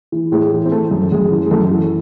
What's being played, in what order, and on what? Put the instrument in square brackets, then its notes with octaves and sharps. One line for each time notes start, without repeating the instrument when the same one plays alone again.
[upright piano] E3
A2 G#3
E3
C4
E3 A3
F#2
F#2 G#3
E3
G#3
F#2 A3
E3